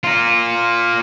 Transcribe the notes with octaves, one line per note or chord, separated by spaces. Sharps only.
F4 A#4